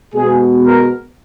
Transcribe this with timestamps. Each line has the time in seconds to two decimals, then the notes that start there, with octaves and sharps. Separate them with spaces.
0.14 B2 G#3 B3 G#4
0.65 A#4